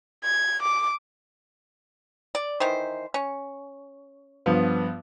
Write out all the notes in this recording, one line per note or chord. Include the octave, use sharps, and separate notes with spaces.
G#6
D6
D5
D#3 E3 C5
C#4
G2 F3 B3